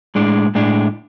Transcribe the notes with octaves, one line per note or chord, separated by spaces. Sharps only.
A2 G#3 D4
A2 G#3 D4